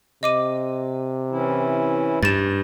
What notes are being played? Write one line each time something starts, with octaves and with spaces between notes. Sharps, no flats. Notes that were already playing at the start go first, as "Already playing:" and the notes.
C3 D#5 D6 D#7
E3 C#4 E4
G2 A6 E7